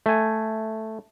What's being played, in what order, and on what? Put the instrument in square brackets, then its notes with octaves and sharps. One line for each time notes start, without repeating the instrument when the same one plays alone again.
[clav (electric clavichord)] A3 G#5